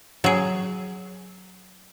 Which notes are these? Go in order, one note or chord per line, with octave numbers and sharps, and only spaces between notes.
F#3 G#4